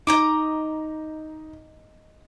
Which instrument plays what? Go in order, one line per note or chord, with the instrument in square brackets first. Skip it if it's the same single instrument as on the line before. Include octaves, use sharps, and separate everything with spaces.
[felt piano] D#4 [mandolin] D#5 A#5 D6